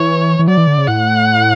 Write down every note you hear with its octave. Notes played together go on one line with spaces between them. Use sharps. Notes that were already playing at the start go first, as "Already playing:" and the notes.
Already playing: E3 C#5
E3
F#3 D5
E3
D3
C#3
A2 F#5